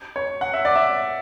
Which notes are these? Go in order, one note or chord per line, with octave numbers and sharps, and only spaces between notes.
C#5
F#5
E5
D5
E5